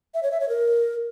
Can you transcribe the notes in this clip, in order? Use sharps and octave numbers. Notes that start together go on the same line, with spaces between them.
E5
C#5
E5
C#5
A#4